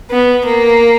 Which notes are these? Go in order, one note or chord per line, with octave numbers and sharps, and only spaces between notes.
B3
A#3